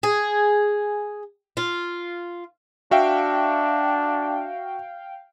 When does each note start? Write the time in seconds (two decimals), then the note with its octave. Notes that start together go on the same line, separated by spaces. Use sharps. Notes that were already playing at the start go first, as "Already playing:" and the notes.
0.03 G#4
1.57 F4
2.91 D4 F#4 E5 F5 G5